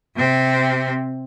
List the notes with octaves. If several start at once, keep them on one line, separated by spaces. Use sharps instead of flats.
C3 C4